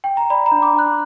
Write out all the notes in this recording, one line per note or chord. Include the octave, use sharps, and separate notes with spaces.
G5
A#5
D5 B5
A#5
D4
D6
D4
F#6